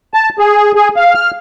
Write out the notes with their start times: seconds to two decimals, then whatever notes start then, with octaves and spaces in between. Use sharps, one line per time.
0.14 A5
0.39 G#4
0.75 G#4
0.96 F5
1.14 F6